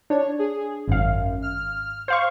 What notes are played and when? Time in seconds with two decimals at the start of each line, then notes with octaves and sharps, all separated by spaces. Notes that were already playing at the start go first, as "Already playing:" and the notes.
0.10 D4 C#5
0.39 G#4
0.88 G#1 F#2 F5
1.42 F6
2.08 C5 F5 C#6